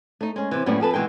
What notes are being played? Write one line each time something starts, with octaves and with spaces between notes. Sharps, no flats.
A3 D#4
G#3 C#4
C3 E3
F#2 A2 G3 A#3 B3 C#4
F2 G#4 A4 B4
B2 D#3 E3 G#3 G5